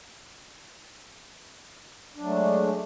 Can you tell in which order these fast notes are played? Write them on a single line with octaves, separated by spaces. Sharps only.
D4 F#3 A3 G#3